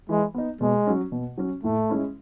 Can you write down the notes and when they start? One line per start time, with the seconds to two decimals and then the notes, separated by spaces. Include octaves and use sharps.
0.09 E3 G#3
0.34 B3 D#4
0.61 B2 G#3
0.87 F#3 C#4
1.12 B2
1.38 F#3 C#4
1.63 A2 A3
1.90 G#3 C#4 E4